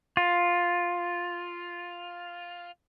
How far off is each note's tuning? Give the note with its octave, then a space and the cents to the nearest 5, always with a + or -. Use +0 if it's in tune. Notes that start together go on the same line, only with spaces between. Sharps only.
F4 +5